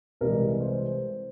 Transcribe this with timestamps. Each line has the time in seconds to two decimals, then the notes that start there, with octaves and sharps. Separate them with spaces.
0.21 C2 C3 E3 G#3 A#4
0.61 C5